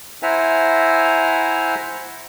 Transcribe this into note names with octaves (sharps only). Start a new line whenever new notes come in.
E4 C5 E5 F#5 G#5 A#5